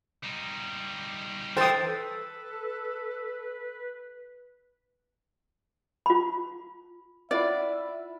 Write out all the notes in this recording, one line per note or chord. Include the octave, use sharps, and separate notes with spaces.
G3 D#4
E3 A4 C5 G5 D#6 A6
A4 B4
F4 B5
E4 F4 D5 E5 B5